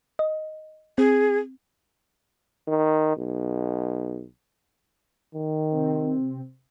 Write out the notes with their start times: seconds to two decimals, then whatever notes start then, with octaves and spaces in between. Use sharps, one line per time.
0.19 D#5
0.98 C4 G#4
2.68 D#3
3.17 B1
5.35 D#3
5.71 C3 C4